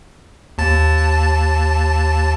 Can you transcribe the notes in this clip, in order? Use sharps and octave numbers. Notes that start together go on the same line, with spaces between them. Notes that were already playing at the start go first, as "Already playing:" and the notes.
D#2 A5 A6